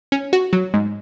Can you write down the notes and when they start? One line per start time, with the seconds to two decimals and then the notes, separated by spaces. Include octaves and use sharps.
0.12 C#4
0.33 F#4
0.53 F#3
0.74 G#2